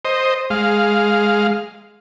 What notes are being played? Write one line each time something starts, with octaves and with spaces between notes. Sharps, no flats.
C5 D#5
G#3 F5